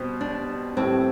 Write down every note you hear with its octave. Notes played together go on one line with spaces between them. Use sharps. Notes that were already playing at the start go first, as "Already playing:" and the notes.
Already playing: B2 G3 C4 G4 C5
D4
A2 E3 G3 C4